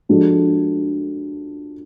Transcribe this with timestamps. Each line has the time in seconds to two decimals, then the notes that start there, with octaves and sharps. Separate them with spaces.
0.09 F3 G#3 D4 F#4 A4